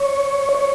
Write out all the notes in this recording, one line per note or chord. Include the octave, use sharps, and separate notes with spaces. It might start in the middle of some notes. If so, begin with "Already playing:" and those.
Already playing: C#5
C#5